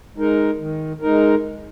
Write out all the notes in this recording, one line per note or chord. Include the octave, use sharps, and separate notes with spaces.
G#3 D#4 A#4
D#3
G#3 D#4 A#4